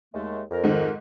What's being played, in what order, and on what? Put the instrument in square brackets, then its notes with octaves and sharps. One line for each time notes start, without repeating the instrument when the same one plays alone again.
[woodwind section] D#2 G#3 A3
F2 A#4
[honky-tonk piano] G#2 D#3